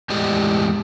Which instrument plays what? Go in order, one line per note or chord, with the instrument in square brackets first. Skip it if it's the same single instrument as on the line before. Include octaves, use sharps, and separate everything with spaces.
[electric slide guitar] E2 A2 G#3 G4 D5 D#5